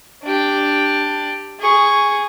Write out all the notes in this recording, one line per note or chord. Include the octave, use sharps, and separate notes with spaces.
D4 G4
G#4 C#6